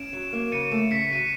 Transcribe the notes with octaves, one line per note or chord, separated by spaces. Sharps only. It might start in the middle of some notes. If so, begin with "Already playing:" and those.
Already playing: C#4 D7 E7
F#3
A#3
C#3 C#7 D#7
A3
C#3 B6 C#7
F#3 D#7